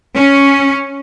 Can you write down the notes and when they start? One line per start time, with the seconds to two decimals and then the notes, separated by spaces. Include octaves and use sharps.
0.14 C#4